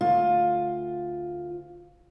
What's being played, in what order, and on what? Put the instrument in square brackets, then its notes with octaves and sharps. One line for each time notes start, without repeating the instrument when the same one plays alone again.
[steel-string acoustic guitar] D2 F4